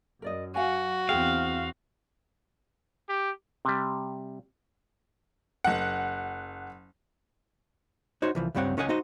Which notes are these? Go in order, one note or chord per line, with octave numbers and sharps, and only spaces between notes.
F#2 A#4 D5 D#5
F#4 F5 G#5
E2 C4 G#4 F5 G5
G4
C3 G3
F#1 F#5
D#4 F#4 C5 C#5
C2 E3 F3
C#2 G2 G3 C4 C#5 F#5
C#2 C#4 C#5 D#5 F#5 G#5
D#4 F#4 C5 D#5